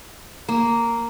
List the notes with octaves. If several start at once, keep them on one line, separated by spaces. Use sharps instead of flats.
A#3